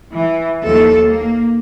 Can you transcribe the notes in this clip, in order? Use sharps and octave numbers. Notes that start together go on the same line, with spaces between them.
E3
D#2 F3 A4
A#3